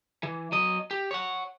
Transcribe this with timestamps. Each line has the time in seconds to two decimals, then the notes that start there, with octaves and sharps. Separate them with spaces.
0.23 E3
0.52 F#3 D#5
0.91 G4
1.11 C#5 F#5